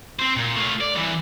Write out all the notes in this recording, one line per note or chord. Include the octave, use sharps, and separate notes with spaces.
C4 C5
A#2
A3 F4
D5
G2 E3